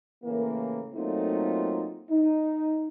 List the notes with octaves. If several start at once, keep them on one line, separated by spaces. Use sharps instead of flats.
A2 C#3 E3 A#3
F#3 A3 A#3 C4 D#4 F4
D#4